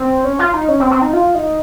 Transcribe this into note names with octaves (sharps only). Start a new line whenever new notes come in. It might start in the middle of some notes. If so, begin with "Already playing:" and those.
Already playing: C4
C#4
F4
D#4
C#4
C4
C4
D#4
F4
D#4